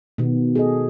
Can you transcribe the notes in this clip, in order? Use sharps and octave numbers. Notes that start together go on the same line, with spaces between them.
B2 D#3 B3
G#4 A4 D#5